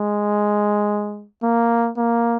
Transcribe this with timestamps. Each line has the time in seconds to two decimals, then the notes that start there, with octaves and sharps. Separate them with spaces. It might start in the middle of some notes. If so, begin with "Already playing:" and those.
Already playing: G#3
1.43 A#3
1.97 A#3